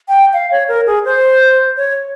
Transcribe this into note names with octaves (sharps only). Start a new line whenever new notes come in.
G5
F5
C#5
A#4
G#4
C5
C#5